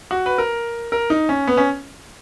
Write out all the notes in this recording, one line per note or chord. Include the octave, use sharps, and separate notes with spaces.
F#4
B4
A#4
A#4
D#4
C#4
B3
C#4